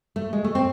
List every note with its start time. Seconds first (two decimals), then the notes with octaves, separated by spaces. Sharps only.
0.16 A3
0.33 G#3
0.44 A3
0.55 C4